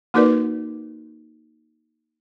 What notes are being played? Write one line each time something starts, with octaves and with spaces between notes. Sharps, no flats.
A#3 D#4 F#4 A#4 B4 D5